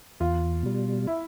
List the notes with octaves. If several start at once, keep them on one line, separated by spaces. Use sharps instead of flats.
E2 F4
B2 G3
E4